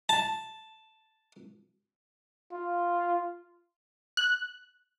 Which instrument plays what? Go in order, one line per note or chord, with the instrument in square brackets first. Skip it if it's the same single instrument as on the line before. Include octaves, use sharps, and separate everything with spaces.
[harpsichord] A5
[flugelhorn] F4
[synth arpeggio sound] F#6